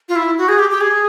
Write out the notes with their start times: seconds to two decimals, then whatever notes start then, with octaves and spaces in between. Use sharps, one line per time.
0.09 F4
0.16 E4
0.38 F#4
0.49 G#4
0.59 G4
0.71 G4
0.81 G#4